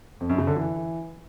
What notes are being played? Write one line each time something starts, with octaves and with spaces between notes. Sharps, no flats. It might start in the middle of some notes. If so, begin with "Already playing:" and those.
F2
F#2
C#3
D3
E3